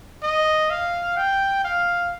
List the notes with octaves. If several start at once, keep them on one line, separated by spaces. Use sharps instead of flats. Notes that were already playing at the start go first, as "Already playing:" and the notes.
D#5
F5
G5
F5